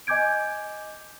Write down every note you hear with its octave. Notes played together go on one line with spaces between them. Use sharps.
D#5 G#5 D6 G6 G#6 D7